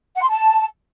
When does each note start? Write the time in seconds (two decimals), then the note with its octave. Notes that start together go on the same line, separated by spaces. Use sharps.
0.16 F#5
0.22 C6
0.29 A5